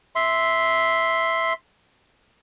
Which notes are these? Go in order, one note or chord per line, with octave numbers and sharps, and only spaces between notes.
E5 C6